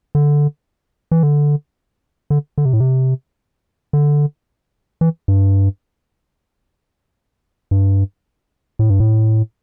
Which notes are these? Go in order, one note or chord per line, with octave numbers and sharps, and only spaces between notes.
D3
E3
D3
D3
D3
C3
A2
C3
D3
E3
G2
G2
A2
G2
A2